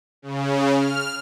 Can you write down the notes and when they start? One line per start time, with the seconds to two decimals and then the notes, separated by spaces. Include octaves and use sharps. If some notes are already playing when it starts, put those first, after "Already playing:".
0.22 C#3
0.72 F6